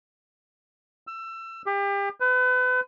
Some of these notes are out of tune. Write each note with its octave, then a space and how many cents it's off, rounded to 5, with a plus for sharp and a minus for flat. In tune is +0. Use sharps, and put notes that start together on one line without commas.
E6 +25
G4 +35
B4 +35